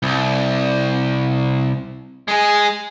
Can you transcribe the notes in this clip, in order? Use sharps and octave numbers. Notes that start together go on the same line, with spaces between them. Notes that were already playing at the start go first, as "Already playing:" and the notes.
C2
G#3 G#4